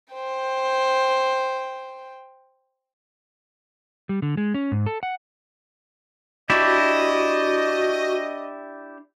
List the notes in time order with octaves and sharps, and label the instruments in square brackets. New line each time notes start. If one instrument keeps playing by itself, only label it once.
[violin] C5 G5
[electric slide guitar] G3
D3
G#3
C#4
G#2
A4
F#5
[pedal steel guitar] D4 E4 G4 [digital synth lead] F#4 [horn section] D#5